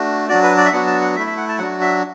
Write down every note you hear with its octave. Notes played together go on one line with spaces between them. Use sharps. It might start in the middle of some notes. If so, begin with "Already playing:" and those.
Already playing: A3 D4 F#4
F#3 D4 F#4 D5
B4
D5
E5
F#3 B3 D4 F#4 F#5
A5
F#5
A3 E4 E5
E5
F#5
A5
F#3 D4 F#4 F#5
E5